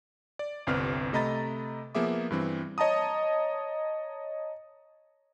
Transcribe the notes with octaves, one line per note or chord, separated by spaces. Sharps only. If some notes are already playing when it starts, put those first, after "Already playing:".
D5
G1 C2 C4 B4 F6
C3 A3 D#5 A#5 B5 A6
F3 A#3 B3 G#4 E5 D6
G2 E3 C4
C#5 D#5 A5 A#5 D#6